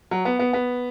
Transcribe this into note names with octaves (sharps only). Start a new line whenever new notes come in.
F#3
B3
B3
B3